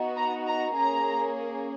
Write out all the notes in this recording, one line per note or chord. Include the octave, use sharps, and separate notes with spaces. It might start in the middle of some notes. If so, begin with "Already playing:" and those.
Already playing: B3 D#4 F#4
A#5
A#5
A#3 C#4 G#4 A#5